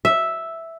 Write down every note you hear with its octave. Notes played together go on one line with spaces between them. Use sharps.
E5